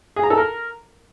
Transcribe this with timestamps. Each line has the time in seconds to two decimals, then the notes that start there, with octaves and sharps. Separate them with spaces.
0.16 G#4
0.23 A#5
0.30 A4
0.37 A#4